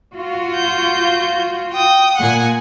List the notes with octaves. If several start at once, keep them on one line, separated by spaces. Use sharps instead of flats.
F4 F#4
G6
G5 D#6
A#2 F#5 G#5